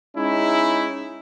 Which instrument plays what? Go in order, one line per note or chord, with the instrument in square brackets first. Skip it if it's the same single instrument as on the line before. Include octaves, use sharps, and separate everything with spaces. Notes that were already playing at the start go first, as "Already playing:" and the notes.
[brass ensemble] G#3 C#4 D#4 E4